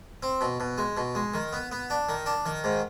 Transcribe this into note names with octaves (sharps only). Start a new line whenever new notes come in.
C4
B2
B2
G#3
B2
G#3
D#3
B3
B3
D4
D#3
D4
D#3
G#2